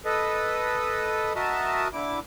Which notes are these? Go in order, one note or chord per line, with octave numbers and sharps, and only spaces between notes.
A4 B4 D#5
F#4 A#4 D#5 E5 A5
D3 E4 D6